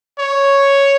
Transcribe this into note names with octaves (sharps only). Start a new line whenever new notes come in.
C#5